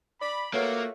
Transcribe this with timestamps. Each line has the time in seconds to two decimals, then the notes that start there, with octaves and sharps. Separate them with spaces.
0.21 D5 B5
0.53 A3 A#3 F4 F#4 B4 C#5